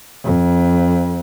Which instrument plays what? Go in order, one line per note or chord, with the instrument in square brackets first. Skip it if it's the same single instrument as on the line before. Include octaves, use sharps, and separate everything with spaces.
[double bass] F2